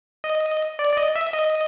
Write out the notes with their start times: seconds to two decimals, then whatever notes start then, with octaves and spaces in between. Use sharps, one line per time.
0.24 D#5
0.79 D5
0.92 D5
0.97 D#5
1.16 E5
1.33 D#5